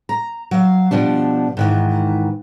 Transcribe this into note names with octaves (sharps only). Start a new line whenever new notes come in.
A#5
F#3 F5
B2 F3 G3 D4
G#2 D#3 E3